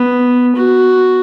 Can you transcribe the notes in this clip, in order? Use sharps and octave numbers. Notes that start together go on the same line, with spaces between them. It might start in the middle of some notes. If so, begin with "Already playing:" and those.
Already playing: B3
F#4